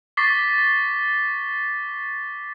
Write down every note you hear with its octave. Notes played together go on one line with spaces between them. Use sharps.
C#6 D6 A6 B6 C7 G7